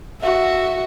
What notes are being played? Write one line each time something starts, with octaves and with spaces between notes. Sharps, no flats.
F#4 E5